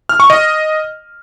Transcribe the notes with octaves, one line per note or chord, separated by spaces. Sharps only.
F6
C#6
D#5